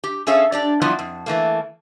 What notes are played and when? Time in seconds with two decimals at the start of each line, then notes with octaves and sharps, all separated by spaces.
0.04 G4
0.27 C#4 G#4 A4 C#5 E5 F5
0.52 D4 G4 D5
0.82 F3 G3 B3 D4 E4 F4
0.99 F2
1.26 E3 A3 A#3